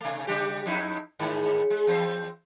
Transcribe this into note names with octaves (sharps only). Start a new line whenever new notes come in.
C3 A3
C#3 G3 G4
F2 D#4 E4
G#2 D#3 G#3
G#3
E2 C4 C5